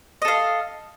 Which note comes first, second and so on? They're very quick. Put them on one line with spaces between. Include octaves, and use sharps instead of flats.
D#5 A4 F5